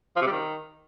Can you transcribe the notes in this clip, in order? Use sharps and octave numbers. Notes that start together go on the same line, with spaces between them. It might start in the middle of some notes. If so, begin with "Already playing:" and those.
F3
C3
G3
D#3